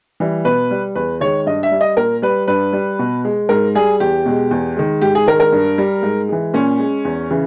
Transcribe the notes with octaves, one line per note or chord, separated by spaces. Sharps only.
E3 G3
B2 B4
G3
E2 B4
D#3 G#3 C#5
G2 D#5
E5
G3
D#5
A#2 A#4
G3 B4
G2 B4
G3
B2
G#3
G#2 A#4
G3 G#4
E2 G4
B2 G#3
E2
D#3 G#3
G#2 G4
G#4
D#3 G#3 A#4
A#4
G2
G3
G#2
E3 G#3
A#2 C#4
G#3
E2
C#3 E3